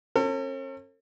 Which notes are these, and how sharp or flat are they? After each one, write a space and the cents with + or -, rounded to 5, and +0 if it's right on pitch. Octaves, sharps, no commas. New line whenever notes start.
C#4 -45 A4 +45